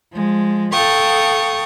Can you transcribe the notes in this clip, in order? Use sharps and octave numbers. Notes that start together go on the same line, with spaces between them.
F3 G#3
A4 F5 G5 C#6 D#6